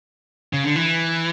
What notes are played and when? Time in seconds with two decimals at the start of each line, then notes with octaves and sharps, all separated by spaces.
0.53 C#3
0.64 D3
0.76 E3